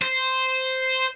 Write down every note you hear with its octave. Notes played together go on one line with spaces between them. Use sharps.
C5